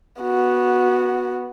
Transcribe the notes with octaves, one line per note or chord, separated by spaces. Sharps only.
B3 F#4